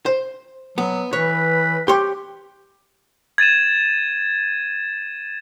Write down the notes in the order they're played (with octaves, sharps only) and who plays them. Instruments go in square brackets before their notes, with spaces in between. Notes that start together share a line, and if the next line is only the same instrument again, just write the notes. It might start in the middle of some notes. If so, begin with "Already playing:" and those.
[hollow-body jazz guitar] C5
[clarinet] F#3 [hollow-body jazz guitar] B3
[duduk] E3 [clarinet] B4 [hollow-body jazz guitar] C#5
[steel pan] G4 [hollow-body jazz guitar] C#5 C6
[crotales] G#6 A6 D#7 E7